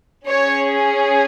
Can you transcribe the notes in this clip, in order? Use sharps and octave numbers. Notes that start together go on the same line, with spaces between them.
C#4 G#4 C#5